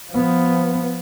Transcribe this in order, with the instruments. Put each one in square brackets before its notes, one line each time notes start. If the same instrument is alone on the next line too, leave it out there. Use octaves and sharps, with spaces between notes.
[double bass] F3 B3